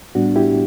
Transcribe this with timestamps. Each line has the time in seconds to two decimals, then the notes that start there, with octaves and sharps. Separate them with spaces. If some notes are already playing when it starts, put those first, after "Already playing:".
0.15 A2 G3 B3 D4 F#4
0.36 E4 G4